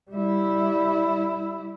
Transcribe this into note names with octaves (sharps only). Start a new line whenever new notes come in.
G3 E4